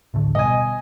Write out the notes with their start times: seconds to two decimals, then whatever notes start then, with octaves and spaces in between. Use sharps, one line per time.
0.14 D1 A1 D3
0.35 B2 G3 D#5 G#5